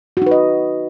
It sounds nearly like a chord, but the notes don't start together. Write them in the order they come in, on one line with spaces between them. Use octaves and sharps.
F#4 D#4 B4 D#5